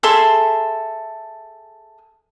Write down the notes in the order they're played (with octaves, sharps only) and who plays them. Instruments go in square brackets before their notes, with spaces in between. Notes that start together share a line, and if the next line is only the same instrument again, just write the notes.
[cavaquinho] G#4 A4 E5 C6